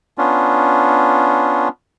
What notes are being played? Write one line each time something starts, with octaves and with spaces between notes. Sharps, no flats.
B3 C#4 D4 F4